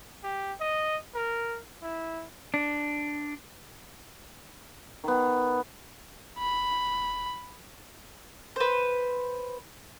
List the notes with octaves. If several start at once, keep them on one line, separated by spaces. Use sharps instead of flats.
G4
D#5
A#4
E4
D4
D#3 B3
F1 B5
B4 C5